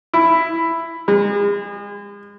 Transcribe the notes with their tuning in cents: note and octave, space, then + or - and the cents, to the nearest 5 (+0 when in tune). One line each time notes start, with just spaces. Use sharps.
E4 +5
G#3 -35